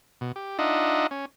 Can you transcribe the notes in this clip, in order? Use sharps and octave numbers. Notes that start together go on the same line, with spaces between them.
B2
G4
D4 D#4 F4 D#5 E5 F#5
C#4